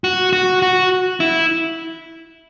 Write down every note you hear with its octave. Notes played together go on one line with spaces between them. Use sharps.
F#4
F#4
F#4
E4